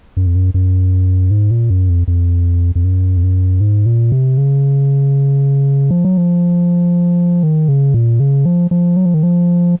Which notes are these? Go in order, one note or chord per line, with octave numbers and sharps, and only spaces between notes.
F#2
F2
F#2
F#2
G#2
A#2
F#2
F2
F2
F2
F#2
F2
F#2
G#2
A#2
C3
C#3
F3
F#3
F3
D#3
C#3
A#2
C#3
F3
F3
F#3
F3
D#3
F3